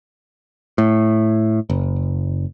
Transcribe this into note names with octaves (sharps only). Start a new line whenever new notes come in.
A2
F#1